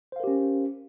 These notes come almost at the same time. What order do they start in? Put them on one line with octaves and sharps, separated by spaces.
C5 F5 A#4 G4 C#4